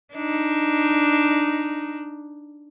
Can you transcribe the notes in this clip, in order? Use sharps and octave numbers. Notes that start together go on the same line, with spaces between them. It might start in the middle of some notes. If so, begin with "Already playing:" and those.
D4 D#4